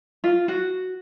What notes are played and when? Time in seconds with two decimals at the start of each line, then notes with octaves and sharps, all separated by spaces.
0.24 F4
0.48 F#4